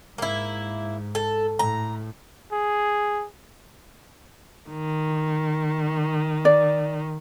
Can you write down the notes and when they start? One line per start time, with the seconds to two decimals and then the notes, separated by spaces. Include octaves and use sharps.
0.18 G#2 A#3 E4
1.15 A4
1.59 A2 A#5
2.52 G#4
4.69 D#3
6.45 D5